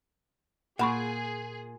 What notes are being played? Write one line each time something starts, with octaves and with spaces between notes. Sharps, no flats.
A#2 G#4 F#5 B5 C#6